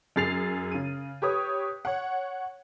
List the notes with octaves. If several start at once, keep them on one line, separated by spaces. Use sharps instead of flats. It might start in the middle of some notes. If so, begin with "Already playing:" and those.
F#2 G#4 A6 C7 F7
C#3 D#7
G4 B4 C#5 D#6
C#5 F#5